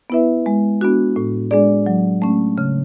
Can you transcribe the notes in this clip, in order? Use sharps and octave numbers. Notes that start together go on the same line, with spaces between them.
B3 E4 B4 E5
G#3
B3 D4 F#4
A2
G#3 D4 G#4 D5
F#3
A3 C#4
C#3